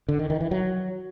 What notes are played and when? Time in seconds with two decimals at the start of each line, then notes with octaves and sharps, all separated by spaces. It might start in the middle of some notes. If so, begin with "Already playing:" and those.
0.09 D3
0.19 D#3
0.30 D#3
0.41 E3
0.51 F#3